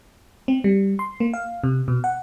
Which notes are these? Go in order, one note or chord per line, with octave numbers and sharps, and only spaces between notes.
C4
G3
C6
A#3
F5
C3
B2
F#5